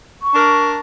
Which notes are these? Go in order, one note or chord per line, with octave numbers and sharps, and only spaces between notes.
C#6
D4 A#4